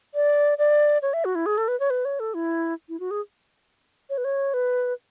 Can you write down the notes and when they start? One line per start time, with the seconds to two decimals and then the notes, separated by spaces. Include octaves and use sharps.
0.14 D5
0.59 D5
1.02 C#5
1.14 E5
1.25 F#4
1.35 E4
1.46 G#4
1.58 A4
1.68 B4
1.80 C#5
1.90 B4
2.05 C#5
2.20 A4
2.34 E4
2.89 E4
3.00 F#4
3.11 G#4
4.10 C#5
4.18 B4
4.25 C#5
4.54 B4